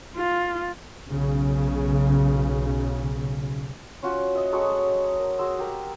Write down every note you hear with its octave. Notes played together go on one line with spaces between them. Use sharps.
F4
B1 C#3
C#4 F4 F#4
D#5 E5
F#3 G#3 A4 C#5
A#4
F#4 G#4 C6 E6
G4 A#4 A#5